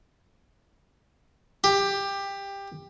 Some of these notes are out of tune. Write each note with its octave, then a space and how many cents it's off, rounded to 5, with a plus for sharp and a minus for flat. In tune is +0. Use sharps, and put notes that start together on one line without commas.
G4 +15